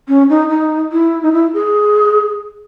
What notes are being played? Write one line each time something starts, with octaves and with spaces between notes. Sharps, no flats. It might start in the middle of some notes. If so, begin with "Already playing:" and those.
C#4
D#4
D#4
E4
D#4
E4
G#4